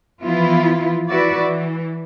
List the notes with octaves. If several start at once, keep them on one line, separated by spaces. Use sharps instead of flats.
E3 F3 B3 E4 F4
E4 F#4 B4 D5 E5
E3